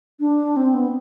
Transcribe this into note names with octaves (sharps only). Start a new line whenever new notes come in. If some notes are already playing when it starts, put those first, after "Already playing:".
D4
C4
B3